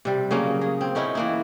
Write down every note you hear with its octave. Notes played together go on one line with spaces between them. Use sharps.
C3 G3
C#3 F#3 A#3 C#4
G#4
C4
B3 C#4 D#4 E4
E3 A#3 E4